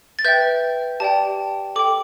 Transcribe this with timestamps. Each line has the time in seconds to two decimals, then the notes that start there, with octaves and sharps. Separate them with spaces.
0.19 A6
0.24 B4 E5 G5 G6
1.00 G4 D5 G5 A5
1.76 A4 G5 D6